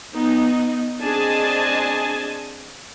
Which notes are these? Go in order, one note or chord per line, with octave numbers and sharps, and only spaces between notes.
B3 D#4
C4 D4 G#4 D#5 G#5 A5